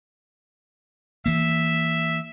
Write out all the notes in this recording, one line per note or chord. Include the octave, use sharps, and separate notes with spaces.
E3 A#3 E5